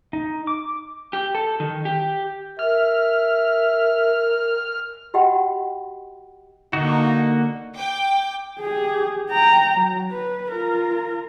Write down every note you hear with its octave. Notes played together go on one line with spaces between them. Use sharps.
D#4
D6
G4
A4
D#3
G4
A#4 E5 F6
F#4 G4 D#5 F#5 G5 B5
D3 A#3 D#4 F#4
G5 D6
G4 G#4
G5 A#5
F#3
B4
F4 A#4